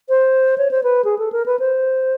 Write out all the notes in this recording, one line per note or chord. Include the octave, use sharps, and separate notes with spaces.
C5
C#5
C5
B4
G#4
A4
A#4
B4
C5